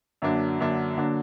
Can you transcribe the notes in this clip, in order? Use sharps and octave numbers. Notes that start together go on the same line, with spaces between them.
F#2 D3 F#3 A#3 D4
F#2 D3 F#3 A#3 D4
D3 F#3 A#3 D4